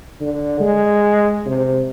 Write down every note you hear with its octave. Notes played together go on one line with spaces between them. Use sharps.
D3
G#3
C3